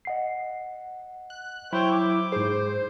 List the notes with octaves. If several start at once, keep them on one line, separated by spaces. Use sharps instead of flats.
D#5 F#5 C7
F#6
F#3 E4 C5 C#5 G5
D6
G#2 G#4 C5